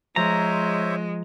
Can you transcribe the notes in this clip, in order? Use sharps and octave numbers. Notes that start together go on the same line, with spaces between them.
F3 G#3 C5 C#5 E5 A#5